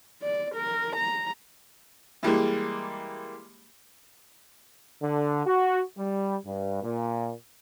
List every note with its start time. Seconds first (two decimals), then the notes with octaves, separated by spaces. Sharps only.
0.23 D5
0.55 A#4
0.96 A#5
2.23 E3 G3 G#3 A#3
5.03 D3
5.45 F#4
5.98 G3
6.45 G2
6.83 A#2